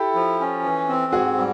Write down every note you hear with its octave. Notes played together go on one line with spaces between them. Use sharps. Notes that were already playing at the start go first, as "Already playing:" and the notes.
Already playing: E4 G4 A4
F3
C#4
E3
C4
G#2 F#4 G#4
G3